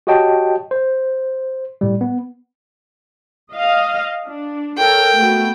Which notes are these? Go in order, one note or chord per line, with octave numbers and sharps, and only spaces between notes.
F#4 G4 C#5 D#5 G5 A5
C5
A2 G3
B3
D#5 F5
D4
A4 A#4 C#5 G5
A3 B3 F#4